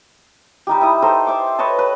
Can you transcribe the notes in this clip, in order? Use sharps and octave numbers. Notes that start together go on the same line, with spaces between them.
G3 D#4 G4
E4 D#6
D#4 A4 C5
C5 E5 D6
B4 C#5 D#5 A5
B4